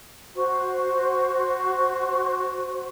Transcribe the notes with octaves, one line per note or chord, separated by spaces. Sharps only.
F#4 C5 C#6